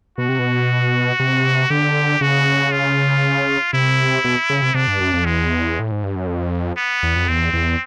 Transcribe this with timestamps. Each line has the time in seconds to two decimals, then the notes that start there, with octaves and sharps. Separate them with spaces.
0.18 B2 F#4
0.29 C3
0.39 B2
1.20 C3
1.70 D3 G4
2.21 C#3 F#4
2.72 F4
3.73 C3 E4
4.24 B2
4.50 C#3
4.62 C3
4.74 C3 D4
4.88 G2
5.00 F#2
5.13 F2
5.25 E2 G#3
5.79 A2
5.92 G#2
6.03 G2
6.16 F#2
6.27 F2
6.77 B3
7.03 E2
7.16 F2
7.28 E2 C4
7.53 E2